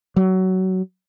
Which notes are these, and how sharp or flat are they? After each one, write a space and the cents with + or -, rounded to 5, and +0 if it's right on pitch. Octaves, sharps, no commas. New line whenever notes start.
F#3 +20